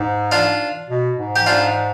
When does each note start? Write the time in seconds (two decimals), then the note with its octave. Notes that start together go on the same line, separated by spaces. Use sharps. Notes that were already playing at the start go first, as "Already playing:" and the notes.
Already playing: G#2
0.32 D4 F4
0.90 B2
1.18 G#2
1.36 G4
1.46 D4 F4